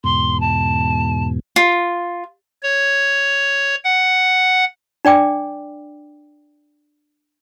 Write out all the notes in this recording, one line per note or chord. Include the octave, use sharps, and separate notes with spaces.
E2 G#2 B2 C6
A5
F4
C#5
F#5
D4 D5 G5 D6